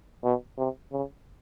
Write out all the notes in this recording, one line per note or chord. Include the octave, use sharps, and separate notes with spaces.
B2
C3
C#3